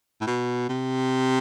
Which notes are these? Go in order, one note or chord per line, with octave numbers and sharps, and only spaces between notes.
A2
B2
C3